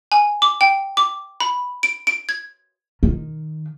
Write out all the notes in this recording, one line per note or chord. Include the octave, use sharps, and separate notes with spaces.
G#5
D6
G5
D6
B5
D7
D7
G#6
D#3